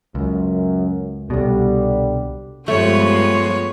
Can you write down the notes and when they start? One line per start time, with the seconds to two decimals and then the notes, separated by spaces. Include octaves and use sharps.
0.15 C#2 F#2
1.30 C2 B2 D3 G3
2.68 G2 F3 G#3 A3 B3 C#5